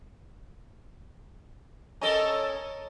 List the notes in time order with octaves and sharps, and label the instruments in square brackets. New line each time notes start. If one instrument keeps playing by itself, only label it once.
[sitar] C#4 A4 A#4 [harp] D#5 A#5